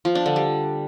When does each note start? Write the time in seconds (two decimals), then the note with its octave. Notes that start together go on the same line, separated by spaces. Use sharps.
0.05 F3
0.15 D4
0.26 D3
0.36 G3